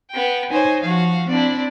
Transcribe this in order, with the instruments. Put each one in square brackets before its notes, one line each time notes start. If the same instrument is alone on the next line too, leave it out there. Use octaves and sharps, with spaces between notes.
[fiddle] B3 G5
[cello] D#4 C#5 [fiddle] C5 G#5
[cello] F3 [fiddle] F#4 F5
[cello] C4 D4 [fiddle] E4 D5